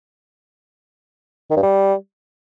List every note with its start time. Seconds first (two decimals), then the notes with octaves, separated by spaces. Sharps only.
1.50 D#3
1.57 G2
1.63 G3